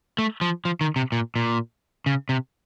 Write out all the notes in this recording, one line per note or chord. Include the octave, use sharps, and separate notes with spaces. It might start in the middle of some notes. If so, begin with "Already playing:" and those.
A3
F3
F3
D#3
C3
A#2
A#2
C#3
C3